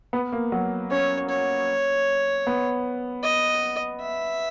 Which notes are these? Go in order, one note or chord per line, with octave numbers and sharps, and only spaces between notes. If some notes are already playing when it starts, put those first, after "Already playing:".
B3
A#3
F#3
C#4 C#5
C#5
B3
D#5
E5